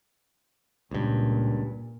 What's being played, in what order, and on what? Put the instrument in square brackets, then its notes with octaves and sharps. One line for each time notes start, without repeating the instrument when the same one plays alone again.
[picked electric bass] C#2 G2 [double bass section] A#2